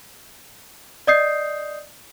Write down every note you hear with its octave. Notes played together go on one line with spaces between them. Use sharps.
D5 D#5 D#6 G6 C7